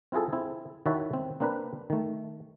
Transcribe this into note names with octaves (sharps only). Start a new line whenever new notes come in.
C4 E4 F4 G#4 A4
C4 E4
D#3 E4 F#4 C#5 E5 A5
C4
A#3 C4 D4 A#4 B4
D#3 A3